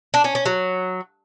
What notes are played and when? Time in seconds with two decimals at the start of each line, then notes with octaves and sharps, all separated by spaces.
0.14 D4
0.24 C#4
0.35 C#4
0.46 F#3